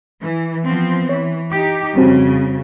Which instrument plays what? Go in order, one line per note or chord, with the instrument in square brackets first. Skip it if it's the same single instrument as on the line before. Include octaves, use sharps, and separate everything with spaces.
[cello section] E3
F3 B3 C4
[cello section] E3 [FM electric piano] C#5
[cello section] D#4 G4 [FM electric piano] D6 G6
[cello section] F2 C#3 [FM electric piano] G3 C4 F#4